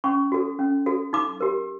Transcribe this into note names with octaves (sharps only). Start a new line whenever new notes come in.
C#4 C#6
F#4 A4
C#4
F#4 A4
D#4 D6
G4 A#4